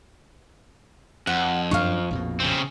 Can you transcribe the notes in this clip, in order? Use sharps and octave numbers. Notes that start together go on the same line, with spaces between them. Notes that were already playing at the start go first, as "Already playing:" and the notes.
F2 F#5
F#2 D4 F5 C#6
A#1 F2 B2
C#3 C4